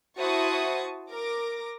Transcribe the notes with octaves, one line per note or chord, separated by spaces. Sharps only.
E4 F#4 C5 A5 C#6 D#6
A#4 D6 A#6